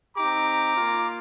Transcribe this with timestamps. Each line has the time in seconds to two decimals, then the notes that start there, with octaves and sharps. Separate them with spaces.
0.16 C4 D#4 G4 A#5 D6
0.76 A#3 F4